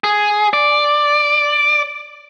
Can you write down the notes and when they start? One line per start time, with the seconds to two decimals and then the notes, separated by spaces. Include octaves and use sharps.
0.04 G#4
0.53 D5